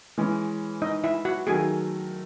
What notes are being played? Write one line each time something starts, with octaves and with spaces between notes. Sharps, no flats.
E3 G#3 C#4
D#4 D#5
E4 E5
F#4 F#5
D#3 F#3 A3 G#4 G#5